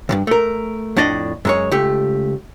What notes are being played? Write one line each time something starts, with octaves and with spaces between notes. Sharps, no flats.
D2 G2
A3 A#4
F2 A2 D4 D5 D#5
F#2 G#3 C#5
C#2 A3 G4